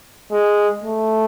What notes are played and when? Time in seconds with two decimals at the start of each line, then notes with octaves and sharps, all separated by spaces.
0.32 G#3
0.83 A3